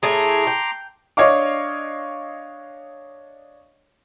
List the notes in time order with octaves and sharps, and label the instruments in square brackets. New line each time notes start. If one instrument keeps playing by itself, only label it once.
[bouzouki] A2 A3 G#4 [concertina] A#5 C6 D6
[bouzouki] G5
[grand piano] D4 C#5 D#5 F5 D6